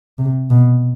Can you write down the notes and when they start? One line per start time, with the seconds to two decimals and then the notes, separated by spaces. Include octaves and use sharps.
0.19 C3
0.50 B2